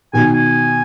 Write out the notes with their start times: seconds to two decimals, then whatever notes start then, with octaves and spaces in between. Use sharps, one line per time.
0.13 B2 D#3 G#5
0.34 G#5